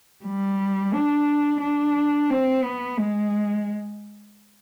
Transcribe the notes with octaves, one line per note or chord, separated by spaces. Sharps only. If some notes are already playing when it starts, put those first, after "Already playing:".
G3
D4
D4
C4
B3
G#3